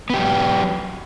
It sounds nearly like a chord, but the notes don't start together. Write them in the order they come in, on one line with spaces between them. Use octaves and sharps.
B3 G4 F#3